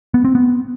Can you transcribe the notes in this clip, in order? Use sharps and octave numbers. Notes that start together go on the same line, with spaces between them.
B3
C4
B3